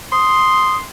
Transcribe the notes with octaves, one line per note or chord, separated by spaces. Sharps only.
C6 D#6